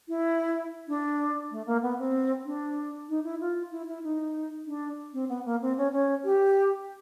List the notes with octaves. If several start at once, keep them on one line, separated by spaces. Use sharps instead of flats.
E4
D4
A3
A#3
B3
C4
D4
D#4
E4
F4
E4
E4
D#4
D4
C4
B3
A#3
C4
C#4
C#4
G4